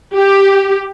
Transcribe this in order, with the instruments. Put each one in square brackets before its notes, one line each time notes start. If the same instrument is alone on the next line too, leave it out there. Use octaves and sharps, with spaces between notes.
[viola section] G4